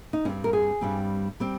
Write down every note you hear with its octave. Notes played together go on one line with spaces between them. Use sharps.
D#4
G2 G3 C4 C#4
A#4
G#4
G2 G3 C4
G3 C4